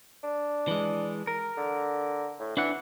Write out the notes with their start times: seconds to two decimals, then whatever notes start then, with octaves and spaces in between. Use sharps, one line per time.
0.24 D4
0.68 E3 G#3
1.27 A#4
1.57 D3
2.39 A2
2.57 E3 D4 F#5